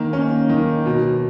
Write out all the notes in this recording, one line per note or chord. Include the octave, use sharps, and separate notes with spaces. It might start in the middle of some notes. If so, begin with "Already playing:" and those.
Already playing: D#3 A#3
C#4
D#3
B2